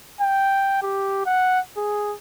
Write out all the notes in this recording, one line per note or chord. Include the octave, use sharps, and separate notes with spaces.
G5
G4
F#5
G#4